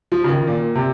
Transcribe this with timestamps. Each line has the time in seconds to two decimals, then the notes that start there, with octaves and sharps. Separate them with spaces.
0.12 F3
0.24 C#3
0.29 D#3
0.47 A#2
0.75 C3